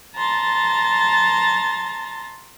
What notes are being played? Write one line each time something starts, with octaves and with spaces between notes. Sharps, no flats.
A5 A#5 C6 A6